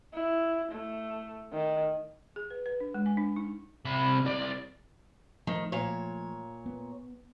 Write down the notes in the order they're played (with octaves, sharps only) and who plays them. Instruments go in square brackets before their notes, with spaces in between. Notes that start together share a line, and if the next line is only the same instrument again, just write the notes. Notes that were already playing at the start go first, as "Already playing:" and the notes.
[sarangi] E4
A3
D#3
[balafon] G#4
B4
B4
D4
G#3
G#5
D4
D#4
[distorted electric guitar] C3 B5
C2 D5
[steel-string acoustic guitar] D#3 [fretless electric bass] F3 A3
[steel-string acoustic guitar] A#2 C#5
[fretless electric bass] B3